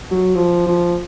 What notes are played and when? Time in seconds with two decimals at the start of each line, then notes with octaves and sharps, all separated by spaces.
0.11 F#3
0.35 F3
0.66 F3